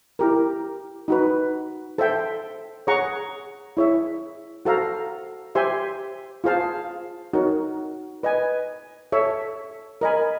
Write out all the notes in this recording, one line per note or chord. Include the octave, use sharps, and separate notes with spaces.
E4 G4 A#4
D#4 F#4 B4
A4 C5 E5 G5
G#4 C#5 F#5 A#5 C#6
E4 G#4 C#5 E5
F#4 A4 C5 F5 A#5
G4 C5 E5 G#5 C6
F4 G#4 C5 F5 A5
D#4 F#4 A#4 C#5
B4 D#5 G#5
A4 C#5 E5
A#4 D#5 G#5 B5